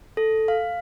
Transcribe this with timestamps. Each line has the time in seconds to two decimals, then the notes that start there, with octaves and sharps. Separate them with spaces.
0.17 A4
0.48 F5